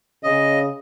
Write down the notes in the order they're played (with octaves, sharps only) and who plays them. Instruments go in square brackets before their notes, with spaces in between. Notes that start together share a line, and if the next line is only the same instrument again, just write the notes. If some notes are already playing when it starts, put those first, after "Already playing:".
[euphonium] C#3 [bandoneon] D#5